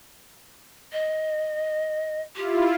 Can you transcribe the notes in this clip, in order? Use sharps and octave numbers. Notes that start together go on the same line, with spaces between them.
D#5
E4 F4 G4